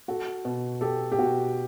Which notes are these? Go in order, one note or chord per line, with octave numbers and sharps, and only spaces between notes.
F#4 A4
B2
G4 A4
G4
B2 F#4